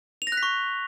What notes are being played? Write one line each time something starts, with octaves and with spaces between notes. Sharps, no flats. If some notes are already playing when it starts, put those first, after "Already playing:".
F7
A#6
F#6
B6
C#6